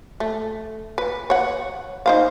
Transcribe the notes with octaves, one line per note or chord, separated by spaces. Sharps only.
A3
B4
C#5 F#5
D#4 C5 F5